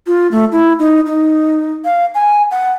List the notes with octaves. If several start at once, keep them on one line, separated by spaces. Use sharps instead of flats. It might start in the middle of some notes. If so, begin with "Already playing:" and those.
F4
A3
E4
D#4
D#4
F5
G#5
F#5